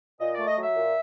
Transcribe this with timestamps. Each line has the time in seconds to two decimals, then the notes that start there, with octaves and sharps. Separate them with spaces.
0.20 A#2 D#5
0.34 A3 D5
0.47 D#5
0.56 F#3 E5
0.75 A#2